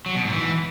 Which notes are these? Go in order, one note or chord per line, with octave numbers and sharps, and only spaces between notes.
F#3
B2
G#2
E3